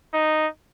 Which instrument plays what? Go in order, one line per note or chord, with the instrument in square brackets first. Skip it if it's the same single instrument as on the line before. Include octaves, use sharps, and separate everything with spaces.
[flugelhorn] D#4